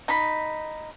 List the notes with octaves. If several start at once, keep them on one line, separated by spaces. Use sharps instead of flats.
D#4 B5